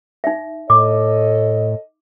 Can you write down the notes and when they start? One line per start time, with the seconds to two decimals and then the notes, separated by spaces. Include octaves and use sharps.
0.24 D#4 E5
0.70 A2 A4 C#5 D#5 D6